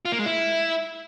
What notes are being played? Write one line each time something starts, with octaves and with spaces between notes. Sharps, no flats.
F4
A#3
G#3
E4